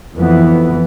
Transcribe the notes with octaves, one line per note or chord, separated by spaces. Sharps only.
F2 E3 B3